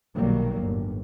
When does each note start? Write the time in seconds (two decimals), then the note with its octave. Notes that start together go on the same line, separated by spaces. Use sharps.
0.15 B1 A#2 D#3 F#3 G3 A#3
0.59 G1 D#2 A2